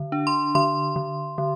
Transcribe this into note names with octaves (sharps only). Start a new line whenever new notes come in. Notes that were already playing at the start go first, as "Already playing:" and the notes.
Already playing: D3
D4
C6
D3 C6
D3
D3